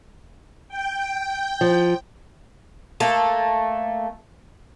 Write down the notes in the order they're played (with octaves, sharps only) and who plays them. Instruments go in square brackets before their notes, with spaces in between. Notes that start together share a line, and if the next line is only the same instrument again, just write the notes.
[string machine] G5
[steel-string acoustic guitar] F3
[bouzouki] A3 A#3 A4